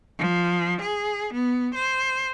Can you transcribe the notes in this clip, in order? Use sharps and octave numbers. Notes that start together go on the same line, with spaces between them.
F3
G#4
B3
C5